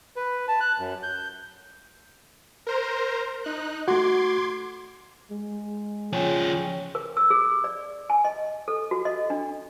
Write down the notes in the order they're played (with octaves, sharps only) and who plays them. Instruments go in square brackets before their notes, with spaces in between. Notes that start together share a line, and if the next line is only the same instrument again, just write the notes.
[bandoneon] B4
A5
F#6
F#2
G6
[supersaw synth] A#4 C5 A#5
D#4 F#6
[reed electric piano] A3 F#4 [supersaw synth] C6 D6 G#6
[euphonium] G#3
[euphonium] C#3 [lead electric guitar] F3 G#4 [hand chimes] C#5 G5
[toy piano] A#4
E6
G#4
D5
G#5
D#5
A4
F#4
D#5
D4